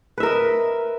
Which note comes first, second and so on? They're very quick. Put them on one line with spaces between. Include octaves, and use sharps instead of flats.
B4 E5 A#4 D#5